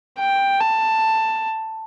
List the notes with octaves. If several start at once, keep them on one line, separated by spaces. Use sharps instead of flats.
G5
A5